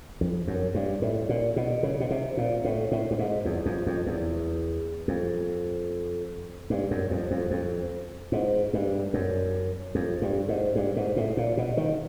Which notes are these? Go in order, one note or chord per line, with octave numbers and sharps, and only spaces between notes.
F2
F#2
G2
A2
A#2
B2
C#3
B2
C3
A#2
A2
A2
G2
G#2
E2
F2
F2
E2
F2
G2
F#2
F2
F2
F2
G#2
G2
F#2
F2
G2
G#2
G2
G#2
A2
A#2
B2
D#3